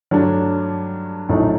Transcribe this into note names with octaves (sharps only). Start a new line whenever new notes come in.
G2 F#3 A3 D4
A#1 A2 F#3 A3 D#4